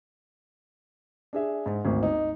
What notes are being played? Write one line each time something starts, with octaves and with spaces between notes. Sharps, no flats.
D4 G#4 E5
G#2
G#1 D2
D#4